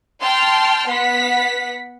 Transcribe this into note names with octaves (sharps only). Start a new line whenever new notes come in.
G5 A5 C6 F6
B3 F#5 B6